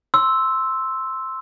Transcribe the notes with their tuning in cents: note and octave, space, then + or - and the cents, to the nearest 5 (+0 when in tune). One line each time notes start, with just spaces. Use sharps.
C6 +0 E6 -5